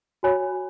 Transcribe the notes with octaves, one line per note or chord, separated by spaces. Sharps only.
F#4 C#5 G#5 B5